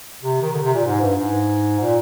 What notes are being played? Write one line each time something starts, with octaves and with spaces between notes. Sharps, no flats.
C3
D#3
D3
C3
A#2
G#2
G2
G#2
A#2